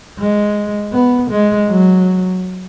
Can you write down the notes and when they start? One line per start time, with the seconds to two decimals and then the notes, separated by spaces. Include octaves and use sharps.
0.19 G#3
0.93 B3
1.30 G#3
1.68 F#3